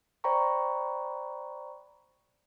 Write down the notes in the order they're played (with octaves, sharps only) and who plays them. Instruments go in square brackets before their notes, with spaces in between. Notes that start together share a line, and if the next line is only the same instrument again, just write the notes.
[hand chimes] C5 D5 G5 A#5 B5 C#6